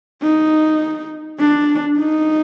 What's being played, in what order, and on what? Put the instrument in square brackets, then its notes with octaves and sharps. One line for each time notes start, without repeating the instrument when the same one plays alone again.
[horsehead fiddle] D#4
D4
D#4